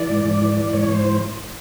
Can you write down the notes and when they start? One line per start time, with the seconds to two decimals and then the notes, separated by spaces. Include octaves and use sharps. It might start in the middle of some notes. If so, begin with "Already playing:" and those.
Already playing: E3 D5
0.09 G#2
0.25 G#2
0.41 E3
0.57 E3
0.73 G#2 C#5
0.88 G#2
0.94 C5
1.05 E3